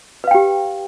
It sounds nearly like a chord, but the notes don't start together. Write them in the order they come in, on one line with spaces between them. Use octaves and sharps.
B4 F5 G5 G4